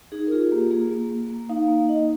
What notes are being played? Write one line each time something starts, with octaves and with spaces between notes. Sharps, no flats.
D#4 G#4
A#4
F4 G#4
A#3 G4
A#3 G#4
A#3
A#3
A#3
D#4 F5
A#3
D#4 D#5